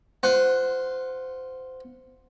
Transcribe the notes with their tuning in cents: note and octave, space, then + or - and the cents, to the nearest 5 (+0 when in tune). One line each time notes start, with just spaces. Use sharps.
F4 +0 C5 -20 F#5 +0